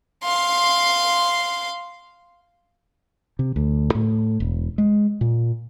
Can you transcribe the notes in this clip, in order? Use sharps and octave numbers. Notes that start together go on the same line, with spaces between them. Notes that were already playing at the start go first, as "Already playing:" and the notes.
F5 C6
C3
D2
A2
E1
G#3
A#2